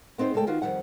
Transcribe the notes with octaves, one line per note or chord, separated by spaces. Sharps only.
B3 C4 D#4 B4 C5
C#3 G#3 A3 A4 G5
D#3 F4 F#4 B4
F2 G#2 D#3 G3 F#5